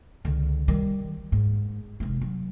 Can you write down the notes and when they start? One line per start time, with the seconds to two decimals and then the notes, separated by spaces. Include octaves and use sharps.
0.25 C#2 D3
0.68 D#3 G3
1.32 G#2
2.00 F1 G#3
2.21 F#3